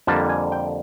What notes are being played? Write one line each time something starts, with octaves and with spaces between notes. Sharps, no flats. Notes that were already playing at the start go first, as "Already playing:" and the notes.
F2 D3 G3 A#3 A5
G#5
G5